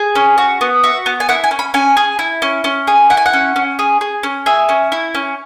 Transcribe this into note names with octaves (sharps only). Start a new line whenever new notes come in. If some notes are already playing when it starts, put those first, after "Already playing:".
Already playing: G#4
C#4
F#4
B3
F#4 E5
B3
G#5
E4 F#5
G#5
C#4
B5
C#4 G#5
G#4
E4
C#4
C#4
G#4
E4 F#5
G#5
F#5
C#4
C#4
G#4
G#4
C#4
G#4 E5
C#4
E4
C#4